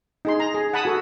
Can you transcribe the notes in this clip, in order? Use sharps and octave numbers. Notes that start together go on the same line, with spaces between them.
D#4 G#4 C6
A#5
G#4
F#5 A5 B5 D#6
F#4 A4